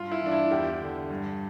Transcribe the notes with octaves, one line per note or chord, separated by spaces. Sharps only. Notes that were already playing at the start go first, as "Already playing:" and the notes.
Already playing: G2 F4
E4
E3 D4
E4
E2 G4
D3
G2